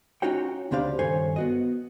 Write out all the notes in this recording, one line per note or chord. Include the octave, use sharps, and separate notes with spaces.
C#4 D#4 F4 F#4 C#5 G5
D2 C#3 C4 D4 G4 F5
G2 D#3 A4 C5 C#5 G#5
B3 F#4 D#5